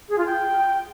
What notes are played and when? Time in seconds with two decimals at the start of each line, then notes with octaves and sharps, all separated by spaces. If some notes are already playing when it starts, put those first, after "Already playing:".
0.09 G#4
0.17 F4
0.26 G5